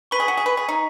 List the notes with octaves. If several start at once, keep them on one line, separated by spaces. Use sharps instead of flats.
B4 C#6 B6 D#7 F#7
G#4
F#4
G#4
B4
G#4
D#4